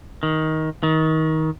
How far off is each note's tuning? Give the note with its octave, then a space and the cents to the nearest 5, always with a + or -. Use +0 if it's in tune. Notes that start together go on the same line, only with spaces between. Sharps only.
D#3 +15
D#3 +25